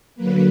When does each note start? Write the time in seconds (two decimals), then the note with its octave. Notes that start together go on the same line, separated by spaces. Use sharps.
0.15 D3 F#3 A#3 B4